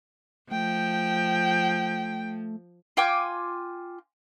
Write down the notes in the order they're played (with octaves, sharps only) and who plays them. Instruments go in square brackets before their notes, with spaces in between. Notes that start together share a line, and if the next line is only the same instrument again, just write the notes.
[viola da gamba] F3 [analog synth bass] A3 [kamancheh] G5
[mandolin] F4 G5 G#5 D6